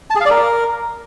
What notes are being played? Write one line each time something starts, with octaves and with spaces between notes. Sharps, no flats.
A5
G#4
F5
D5
A#4